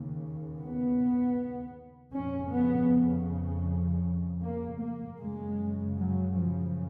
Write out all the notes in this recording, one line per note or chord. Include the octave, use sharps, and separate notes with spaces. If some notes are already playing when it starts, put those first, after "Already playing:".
Already playing: D#2 C#3
B3
F2 C#3 C#4
B3
A#3
A#3
F#2 C#3 G#3
F#3
F3